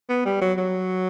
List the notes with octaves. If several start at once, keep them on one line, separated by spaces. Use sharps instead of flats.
B3
G3
F#3
F#3